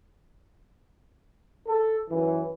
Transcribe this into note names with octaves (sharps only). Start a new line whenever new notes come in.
A4
F#2 E3